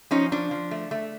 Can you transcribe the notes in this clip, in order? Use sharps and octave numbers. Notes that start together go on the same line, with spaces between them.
F3 C#4 D#4
F3 D4
F3
A3
A3